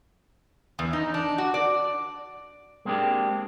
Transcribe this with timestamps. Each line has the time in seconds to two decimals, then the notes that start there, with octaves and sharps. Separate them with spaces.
0.79 E2
0.93 D#4
1.14 D4
1.38 F#4
1.54 D5
2.85 G#3 A#3 C4 D4 G4